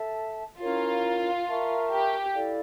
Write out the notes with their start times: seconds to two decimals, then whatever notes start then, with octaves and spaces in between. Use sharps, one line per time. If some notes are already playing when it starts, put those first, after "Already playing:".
Already playing: A4 E5 A5
0.60 C#4 E4 F4 A#4 C#5
1.47 A#4 E5 A5 C#6
1.91 G4
2.34 E4 A4 D5 F5